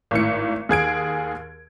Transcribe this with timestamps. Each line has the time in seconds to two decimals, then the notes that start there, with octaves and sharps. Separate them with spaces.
0.11 G#1 A2 C#7
0.69 D#2 G#4 G#6 D7